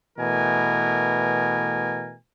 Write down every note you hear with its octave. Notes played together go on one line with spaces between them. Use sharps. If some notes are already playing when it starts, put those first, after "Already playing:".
B2 E3 A3 A#4 G#5